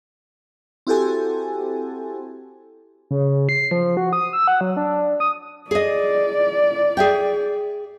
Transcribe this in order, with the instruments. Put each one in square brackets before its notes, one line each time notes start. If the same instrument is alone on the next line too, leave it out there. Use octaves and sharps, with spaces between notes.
[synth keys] C4 E4 F#4 G4 A4 G#5
[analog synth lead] C#3
C7
F3
F#4
D#6
E6
F#5
F#3
D4
D#6
[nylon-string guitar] G#4 D#5 [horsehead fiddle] D5
[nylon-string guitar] G#4 E5 G5